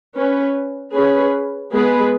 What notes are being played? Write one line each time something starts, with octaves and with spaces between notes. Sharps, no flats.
C#4 B4
C#4 G#4 B4
G#3 B3 G#4 B4